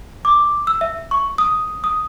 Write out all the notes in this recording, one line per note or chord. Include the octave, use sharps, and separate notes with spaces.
D6
E6
E5
C#6
D#6
D#6